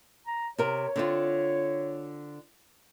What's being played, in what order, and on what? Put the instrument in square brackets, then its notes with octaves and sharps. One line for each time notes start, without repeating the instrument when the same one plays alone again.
[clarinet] A#5
[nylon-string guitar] C3 A#4 [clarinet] C#5
[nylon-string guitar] D3 C4 F4